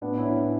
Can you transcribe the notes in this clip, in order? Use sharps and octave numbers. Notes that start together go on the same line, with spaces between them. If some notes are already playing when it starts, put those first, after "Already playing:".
A2 B3 D4
C#4 E4
E3